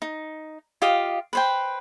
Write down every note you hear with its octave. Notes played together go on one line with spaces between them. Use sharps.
D#4
F4 G4 D#5 F5
B4 C5 G5